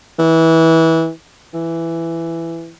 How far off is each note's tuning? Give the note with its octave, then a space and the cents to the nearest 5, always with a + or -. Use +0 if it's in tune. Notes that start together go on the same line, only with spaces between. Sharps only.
E3 -20
E3 +10